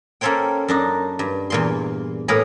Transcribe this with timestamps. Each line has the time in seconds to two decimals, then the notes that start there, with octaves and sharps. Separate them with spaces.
0.21 A#3 C#4 A4 C5 C#5 G5
0.68 F#2 D4 D#4
1.19 G2
1.50 E2 A#2 C6
2.28 A2 A#3 G#4 A#4 B4